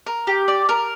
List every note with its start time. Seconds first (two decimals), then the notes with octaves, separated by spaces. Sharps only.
0.07 A#4
0.27 G4
0.48 D5
0.69 A#4